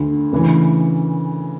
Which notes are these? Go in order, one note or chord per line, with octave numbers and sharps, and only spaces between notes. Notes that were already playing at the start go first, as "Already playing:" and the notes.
Already playing: D2 D3
D2 C#3 E3